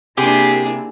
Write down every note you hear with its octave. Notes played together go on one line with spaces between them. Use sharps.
C3 A#3 D4 E4 G4 G#4